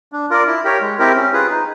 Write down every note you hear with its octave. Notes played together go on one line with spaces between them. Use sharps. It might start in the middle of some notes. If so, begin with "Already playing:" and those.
D4
F4 A#4 D5
E4
G4 A#4 C#5
G#3
C4 E4 G4 A#4
C#4
F4 G#4 B4
D#4